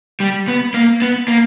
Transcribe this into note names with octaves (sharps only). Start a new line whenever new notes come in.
G3
B3
A#3
B3
A#3